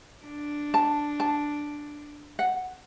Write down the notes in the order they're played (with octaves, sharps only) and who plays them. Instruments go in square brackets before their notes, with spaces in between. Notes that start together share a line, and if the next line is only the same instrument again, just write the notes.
[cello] D4
[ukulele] A5
A5
F#5